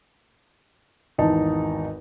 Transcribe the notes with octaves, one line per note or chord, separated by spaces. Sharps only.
G#1 E2 D#4 A5